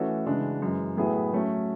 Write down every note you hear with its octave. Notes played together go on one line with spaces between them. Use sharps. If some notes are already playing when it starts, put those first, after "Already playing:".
Already playing: E3 A3 C#4 F#4 A4
C#3 E3 G#3 D4 F#4
F#2 E3 G#3
A2 F#3 B3 E4 G#4
F#3 A3 C#4